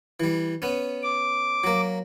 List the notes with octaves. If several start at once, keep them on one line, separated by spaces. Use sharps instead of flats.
E3 G3
B3 C#4
D6
F#3 A#3